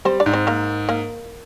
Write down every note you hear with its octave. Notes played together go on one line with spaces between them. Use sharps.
G3 C4 C5
D4 D5
G#2
C4 C5
A#3 A#4
A#3 A#4